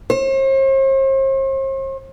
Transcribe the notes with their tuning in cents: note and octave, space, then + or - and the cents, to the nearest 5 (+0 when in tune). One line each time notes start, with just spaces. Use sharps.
C5 +45